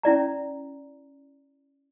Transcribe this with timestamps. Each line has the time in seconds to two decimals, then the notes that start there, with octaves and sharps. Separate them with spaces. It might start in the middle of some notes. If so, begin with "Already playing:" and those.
0.03 C#4 E4 D5 A#5